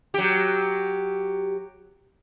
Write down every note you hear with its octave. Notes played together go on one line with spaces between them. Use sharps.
F#3 G4